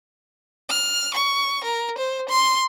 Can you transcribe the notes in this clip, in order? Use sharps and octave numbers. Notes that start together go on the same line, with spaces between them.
F6
C#6
A#4
C5
C6